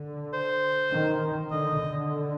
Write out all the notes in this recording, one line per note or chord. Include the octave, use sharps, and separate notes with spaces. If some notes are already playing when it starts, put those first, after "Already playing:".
Already playing: D3
C5
D#3
D3 D#5
D3